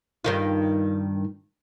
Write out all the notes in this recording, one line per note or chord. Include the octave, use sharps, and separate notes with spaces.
G2 D#3 F4